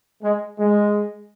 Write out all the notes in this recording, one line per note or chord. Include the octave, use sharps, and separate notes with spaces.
G#3
G#3